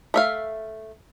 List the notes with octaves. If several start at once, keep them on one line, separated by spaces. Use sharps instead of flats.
A3 E5 F5